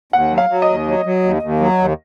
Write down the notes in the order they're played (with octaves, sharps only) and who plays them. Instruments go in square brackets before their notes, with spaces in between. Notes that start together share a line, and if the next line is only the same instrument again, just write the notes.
[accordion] D#2 [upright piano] F#5
[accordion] F#3
[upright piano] F5
[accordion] F#3
[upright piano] D#5
[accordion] D#2
F#3
F#3
D#2
D#2
F#3
D#2